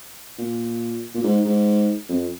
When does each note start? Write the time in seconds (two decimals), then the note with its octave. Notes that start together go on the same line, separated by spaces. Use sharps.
0.38 A#2
1.15 A#2
1.23 G#2
1.44 G#2
2.09 F2